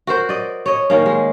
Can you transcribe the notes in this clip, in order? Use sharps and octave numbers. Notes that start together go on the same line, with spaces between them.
F#4 A#4 C5
D5 D#5
C#5 D#5
D#3 A#3 C#4
G#3